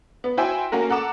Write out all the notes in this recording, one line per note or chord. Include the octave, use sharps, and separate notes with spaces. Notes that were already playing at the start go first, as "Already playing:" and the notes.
B3
E4 F#4 C5 G5 G#5 E6
A#3 C#4 F#4 A#4
A4 F#5 A#5 D6 E7